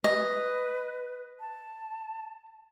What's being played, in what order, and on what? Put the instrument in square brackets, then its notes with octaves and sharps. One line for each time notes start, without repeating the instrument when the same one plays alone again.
[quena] B4 [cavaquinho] D#5
[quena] A5